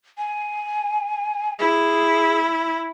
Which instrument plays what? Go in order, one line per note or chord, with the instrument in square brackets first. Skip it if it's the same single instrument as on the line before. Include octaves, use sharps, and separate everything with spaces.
[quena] G#5
[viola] E4 [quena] G#4